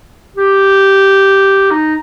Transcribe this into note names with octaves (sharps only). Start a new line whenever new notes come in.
G4
D#4